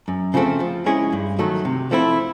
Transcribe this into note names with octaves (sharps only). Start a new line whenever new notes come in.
F#2
C#3 F3 A3 C4
F3
G#3 C#4 E4 G#4
G2
D#3 F#3 A3
C3
F3 A3 C4 E4